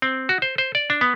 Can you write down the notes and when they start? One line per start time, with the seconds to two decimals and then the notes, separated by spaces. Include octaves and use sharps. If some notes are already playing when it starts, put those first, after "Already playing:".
0.02 C4
0.29 F#4
0.42 C5
0.58 C5
0.75 D5
0.90 D4
1.01 B3